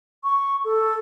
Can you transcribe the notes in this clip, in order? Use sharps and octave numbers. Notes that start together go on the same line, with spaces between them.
C#6
A4